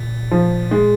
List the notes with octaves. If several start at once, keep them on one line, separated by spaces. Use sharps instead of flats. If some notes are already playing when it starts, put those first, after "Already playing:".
Already playing: A#2
F3
G#3